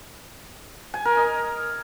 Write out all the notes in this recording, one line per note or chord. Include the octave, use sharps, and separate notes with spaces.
G#5
A#4
D#5